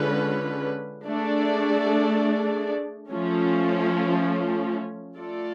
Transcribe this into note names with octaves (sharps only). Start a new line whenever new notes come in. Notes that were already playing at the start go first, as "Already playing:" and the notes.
Already playing: D3 G#3 C#4 F4 B4
A3 D4 G#4 D5
F3 A3 C#4
A3 F4 A4 D5